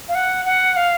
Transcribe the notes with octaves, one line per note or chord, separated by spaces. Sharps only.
F5
F#5
F#5
F5